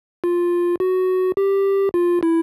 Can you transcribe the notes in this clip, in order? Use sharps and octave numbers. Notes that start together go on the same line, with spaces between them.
F4
F#4
G4
F4
E4